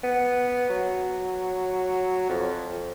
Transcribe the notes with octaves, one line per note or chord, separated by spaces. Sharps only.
B3
F#3
F2